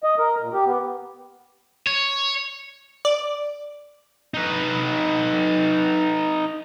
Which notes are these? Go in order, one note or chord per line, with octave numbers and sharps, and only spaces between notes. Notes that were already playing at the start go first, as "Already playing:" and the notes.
D#5
A#4
A#2
G4
B3
C#5
D5
D#4 B4